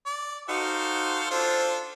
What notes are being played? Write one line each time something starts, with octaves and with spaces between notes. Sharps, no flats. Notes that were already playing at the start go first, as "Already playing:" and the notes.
D5
D#4 F#4 A4 C5 F5
D4 F4 A4 C5